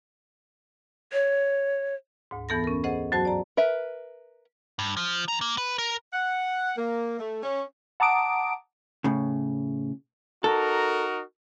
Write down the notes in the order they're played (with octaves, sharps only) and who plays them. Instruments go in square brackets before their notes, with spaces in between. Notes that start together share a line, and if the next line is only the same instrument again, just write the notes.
[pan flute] C#5
[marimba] D2 G#2
F2 E3 B3 A4 B5 A#6
C#4 A#4
G#4 A4 C5 D#5 F#5
G2 F#3 F#4 C5 A5
D5 A#5
[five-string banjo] A#4 B4 E5
[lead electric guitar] G2
F3
E3 A#5
A#3
B4
A#4
[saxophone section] F#5
A#3
A3
C#4
[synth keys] F#5 A5 A#5 D6 D#6 D7
[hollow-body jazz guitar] A2 C#3
[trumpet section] D#4 F#4 A#4 [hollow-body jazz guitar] A4